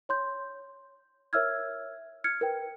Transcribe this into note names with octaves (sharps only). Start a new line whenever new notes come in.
C#5 C6 G6
A#4 C#5 E5 E6 F6 G#6
F6 G#6 C#7
A#4 B4 G5